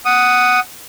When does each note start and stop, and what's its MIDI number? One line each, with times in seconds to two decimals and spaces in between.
0.05 0.60 78
0.05 0.60 87